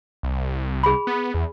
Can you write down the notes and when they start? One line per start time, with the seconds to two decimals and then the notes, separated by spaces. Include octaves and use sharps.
0.23 C2
0.83 G#4 B5
1.07 B3
1.34 E2